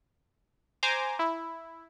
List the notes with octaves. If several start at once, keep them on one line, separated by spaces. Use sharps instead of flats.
C5 G#5 A#5 D6
E4